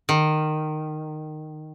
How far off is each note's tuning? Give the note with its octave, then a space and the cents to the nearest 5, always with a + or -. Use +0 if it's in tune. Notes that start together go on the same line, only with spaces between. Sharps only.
D#3 -15